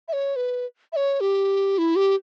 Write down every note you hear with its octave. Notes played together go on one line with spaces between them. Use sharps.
E5
C#5
B4
E5
C#5
G4
E4
G4